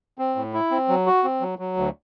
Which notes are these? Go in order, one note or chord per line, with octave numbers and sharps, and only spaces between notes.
C4
A2
E4
C4
F#3
F#4
C4
F#3
F#3
D2